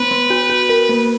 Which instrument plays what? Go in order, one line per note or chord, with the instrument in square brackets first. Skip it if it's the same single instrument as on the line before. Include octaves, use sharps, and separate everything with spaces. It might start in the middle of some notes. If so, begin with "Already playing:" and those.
Already playing: [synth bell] B3 [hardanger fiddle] B4
[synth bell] B3
F#4
F#4
A#4
A#3